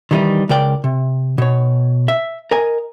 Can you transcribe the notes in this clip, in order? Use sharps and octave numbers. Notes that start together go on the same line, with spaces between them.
D#3 E3 G3 C#4 D#4
C#2 C#3 A#4 D5 G5
C3
B2 C#5
E5
A#4 D#5 G#5